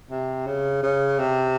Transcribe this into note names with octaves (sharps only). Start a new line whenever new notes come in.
C3
C#3
C#3
C3